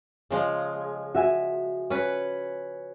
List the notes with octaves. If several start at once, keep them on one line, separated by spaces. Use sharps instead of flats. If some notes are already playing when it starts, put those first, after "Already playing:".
C#3 F3 G#3
F#4 E5 G#5
C#4 B4